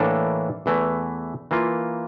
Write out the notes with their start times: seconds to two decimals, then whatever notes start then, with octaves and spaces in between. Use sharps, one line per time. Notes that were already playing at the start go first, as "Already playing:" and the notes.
Already playing: A2 E3 A#3 D4 A4
0.66 E2 E3 A3
1.51 E3 A#3 F4